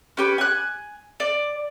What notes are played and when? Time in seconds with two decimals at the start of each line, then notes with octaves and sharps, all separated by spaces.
0.17 C#4 G4 B4
0.38 G#5 F#6
1.20 D5